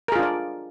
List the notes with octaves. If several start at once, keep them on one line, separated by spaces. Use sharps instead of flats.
D4 F4 G#4 A#4 D5